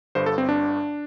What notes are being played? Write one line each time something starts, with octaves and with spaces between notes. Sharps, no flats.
G1 G2 D3 C5
A4
C4
D4